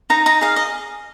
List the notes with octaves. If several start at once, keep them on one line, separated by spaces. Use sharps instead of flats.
D#4 A#5
D#4 A#5
G#4 F5
D#5